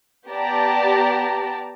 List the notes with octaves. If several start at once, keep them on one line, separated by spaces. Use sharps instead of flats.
B3 G4 D5 A5 A#5